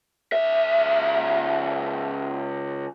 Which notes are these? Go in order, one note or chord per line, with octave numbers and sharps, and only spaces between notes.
C#2 E5